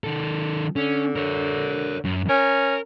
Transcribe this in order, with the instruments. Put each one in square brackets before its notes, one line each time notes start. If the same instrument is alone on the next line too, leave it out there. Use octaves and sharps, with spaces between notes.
[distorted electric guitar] D#3 A4
[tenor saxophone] D3 [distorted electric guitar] C#4
[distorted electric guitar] A#4 C#5
F#2
[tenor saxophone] C#4 [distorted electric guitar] A#4